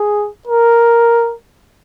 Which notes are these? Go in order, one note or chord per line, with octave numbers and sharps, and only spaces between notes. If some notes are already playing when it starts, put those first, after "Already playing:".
Already playing: G#4
A#4